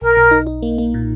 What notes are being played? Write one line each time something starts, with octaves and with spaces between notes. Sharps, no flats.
B1 A#4
B1
D#4
D#4
A#3
A#3
A#2